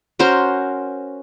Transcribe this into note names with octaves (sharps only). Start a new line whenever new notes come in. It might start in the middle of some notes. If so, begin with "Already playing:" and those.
C#4 F#4 A#4 C5